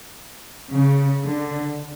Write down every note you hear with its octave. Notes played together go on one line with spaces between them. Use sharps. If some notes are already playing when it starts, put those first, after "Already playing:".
C#3
D3